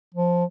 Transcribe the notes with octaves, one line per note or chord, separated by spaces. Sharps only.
F3